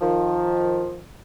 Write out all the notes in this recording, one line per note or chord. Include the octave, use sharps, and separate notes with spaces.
D#3 F3